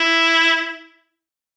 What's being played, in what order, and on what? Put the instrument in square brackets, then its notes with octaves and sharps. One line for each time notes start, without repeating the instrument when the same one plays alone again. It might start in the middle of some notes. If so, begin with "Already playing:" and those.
Already playing: [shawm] E4